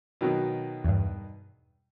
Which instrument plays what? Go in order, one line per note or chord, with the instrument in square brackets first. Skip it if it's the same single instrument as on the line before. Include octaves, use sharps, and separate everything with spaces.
[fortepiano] B2 D#3 F#3
[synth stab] E2 G2